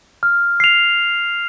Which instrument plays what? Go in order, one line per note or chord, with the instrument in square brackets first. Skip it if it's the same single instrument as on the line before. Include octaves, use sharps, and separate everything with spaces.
[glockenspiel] F6
C7 F7